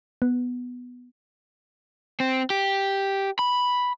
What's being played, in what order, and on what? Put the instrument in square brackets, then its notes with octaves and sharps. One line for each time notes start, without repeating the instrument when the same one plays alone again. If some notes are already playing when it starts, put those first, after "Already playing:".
[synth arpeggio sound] B3
[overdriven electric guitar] C4
G4
B5